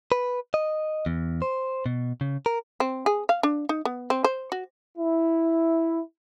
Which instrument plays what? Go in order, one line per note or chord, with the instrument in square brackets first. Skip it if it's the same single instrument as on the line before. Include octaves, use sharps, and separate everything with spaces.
[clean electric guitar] B4
D#5
E2
C5
B2
C#3
A#4
[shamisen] C4
G#4
F5
D4
D#4
B3
C4
C5
F#4
[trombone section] E4